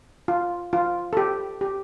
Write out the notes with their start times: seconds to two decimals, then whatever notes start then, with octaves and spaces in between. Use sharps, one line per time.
0.28 F4
0.73 F4
1.13 A4
1.17 G4
1.61 G4